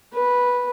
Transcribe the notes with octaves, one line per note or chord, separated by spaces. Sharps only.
B4